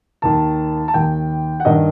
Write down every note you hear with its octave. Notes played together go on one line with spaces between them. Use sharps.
D#2 D#3 A5
A5
D#2 D#3 G5
F#5
G2 D#3 D#5